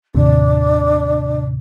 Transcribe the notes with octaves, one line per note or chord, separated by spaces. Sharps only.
D#2 A2 C3 D4